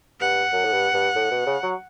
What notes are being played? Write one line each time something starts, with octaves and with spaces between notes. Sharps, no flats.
G2 F#5
F#2
A2
G2
G2
A2
B2
C#3
F#3